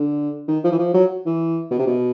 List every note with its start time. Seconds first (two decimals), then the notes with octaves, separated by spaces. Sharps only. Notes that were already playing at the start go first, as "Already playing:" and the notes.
Already playing: D3
0.48 D#3
0.64 F3
0.71 E3
0.79 F3
0.94 F#3
1.26 E3
1.71 B2
1.79 C3
1.87 B2